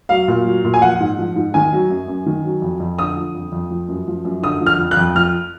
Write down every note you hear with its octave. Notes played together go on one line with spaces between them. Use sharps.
F#3 F5
A#2
F#3
A#2
G#5
F3 F#5
G#2
F3
G#2
D#3 G#5
F#3
F#2
F#2
D#3
F#3
F2
F2
D3 D#6
F3
F2
F2
F3
F#2
F3
F#2
D3 D#6
F3
F6
F2
F#6
F2
F3 F6